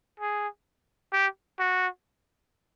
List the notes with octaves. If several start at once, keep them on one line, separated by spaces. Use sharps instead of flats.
G#4
G4
F#4